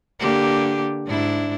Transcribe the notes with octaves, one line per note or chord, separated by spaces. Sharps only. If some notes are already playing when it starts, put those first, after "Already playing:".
D3 A#3 G4
G#2 D4 E4